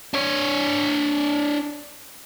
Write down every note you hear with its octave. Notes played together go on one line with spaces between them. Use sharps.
D4 C#5